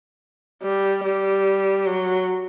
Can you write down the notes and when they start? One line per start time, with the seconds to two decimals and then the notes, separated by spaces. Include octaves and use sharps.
0.63 G3
1.04 G3
1.87 F#3